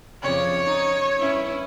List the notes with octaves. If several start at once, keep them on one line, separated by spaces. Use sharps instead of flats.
F2 C#3 C#5 D5
D#4
G2 C#4 E4